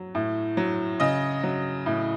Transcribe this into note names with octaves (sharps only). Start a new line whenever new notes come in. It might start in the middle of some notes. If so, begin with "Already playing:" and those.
Already playing: F#3
A2
F#3
C#3 D#5
F#3
A2